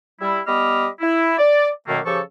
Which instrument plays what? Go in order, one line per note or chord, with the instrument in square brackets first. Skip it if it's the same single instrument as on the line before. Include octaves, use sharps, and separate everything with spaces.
[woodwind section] G3 E4
G3 B3 D#5 B5 D6 F6
E4
D5
F#2 B2 D#3 A3 A#3
C#3 F3 G4 A4 C#6